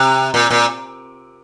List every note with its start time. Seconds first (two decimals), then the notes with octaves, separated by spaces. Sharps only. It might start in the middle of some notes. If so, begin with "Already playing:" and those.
Already playing: C3
0.34 A#2
0.51 A#2